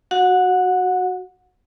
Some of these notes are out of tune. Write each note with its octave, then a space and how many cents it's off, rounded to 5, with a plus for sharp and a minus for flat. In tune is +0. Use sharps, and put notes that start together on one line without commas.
F#4 +0 F#5 -25